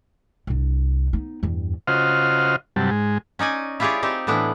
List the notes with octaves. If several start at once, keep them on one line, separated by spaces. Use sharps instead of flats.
C2 D4
B3 D#4
E2 G2
C#3 F4 F#4 C5 D#5 F6
G2 C3 F#3 G3 A5
G#2 G#3
C#4 D#4 D5 G#5
E4 F4 G4 G#4 C#5 D5
C4 D#4 G4
A2 E3 B3 D4 E4